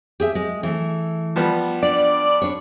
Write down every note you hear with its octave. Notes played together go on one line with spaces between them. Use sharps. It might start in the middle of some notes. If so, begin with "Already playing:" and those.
G4 G#4 E5
G#3
E3 A3
F3 G3 B3
D4 D5
D4 C#5